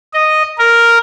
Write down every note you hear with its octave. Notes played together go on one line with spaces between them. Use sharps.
D#5
A#4